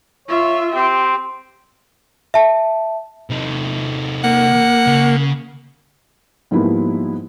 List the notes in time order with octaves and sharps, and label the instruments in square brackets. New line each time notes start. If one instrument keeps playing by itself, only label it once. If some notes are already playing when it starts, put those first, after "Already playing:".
[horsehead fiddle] F4 E5 [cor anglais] C#5
[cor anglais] C4 [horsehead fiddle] G4
[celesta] E5 A5
[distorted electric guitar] C3 D#4
[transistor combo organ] A#3 [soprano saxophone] F#5
[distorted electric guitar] C#3
[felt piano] G#2 F3 G3 A#3 B3 E4